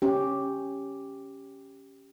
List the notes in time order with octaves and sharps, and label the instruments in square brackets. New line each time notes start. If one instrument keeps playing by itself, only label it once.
[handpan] C#4 G4